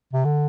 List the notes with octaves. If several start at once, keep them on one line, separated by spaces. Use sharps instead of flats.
C3
D3